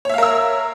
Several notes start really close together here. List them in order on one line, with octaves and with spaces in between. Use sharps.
C#5 E5 F5 A#4 E6